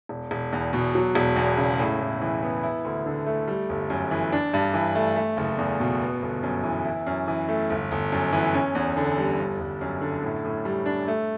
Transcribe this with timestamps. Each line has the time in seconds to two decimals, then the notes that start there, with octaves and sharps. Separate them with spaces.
0.09 E1
0.31 E1
0.53 E2
0.73 B2
0.95 F#3
1.15 E1
1.36 E2
1.57 C#3
1.79 A2
2.00 A2
2.22 E3
2.42 B3
2.63 E4
2.85 D2
3.06 D3
3.26 A3
3.48 G3
3.69 G1
3.90 F#2
4.11 E3
4.33 D4
4.54 G2
4.74 E3
4.95 A3
5.16 A3
5.37 F#1
5.58 E2
5.80 B2
6.01 B3
6.22 G1
6.43 F#2
6.64 E3
6.85 E4
7.07 F#2
7.28 E3
7.48 A3
7.70 G1
7.91 G1
8.12 F#2
8.33 E3
8.55 C#4
8.75 E2
8.97 D3
9.18 G3
9.39 G1
9.60 G1
9.81 F#2
10.01 D3
10.22 A2
10.45 A2
10.65 G3
10.86 D4
11.08 A3